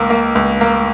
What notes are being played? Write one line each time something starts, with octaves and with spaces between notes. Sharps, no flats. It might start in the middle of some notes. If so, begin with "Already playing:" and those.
Already playing: C#2 A#3
A#3
C#2
A#3